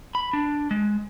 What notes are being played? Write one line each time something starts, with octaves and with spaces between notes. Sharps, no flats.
B5
D4
G#3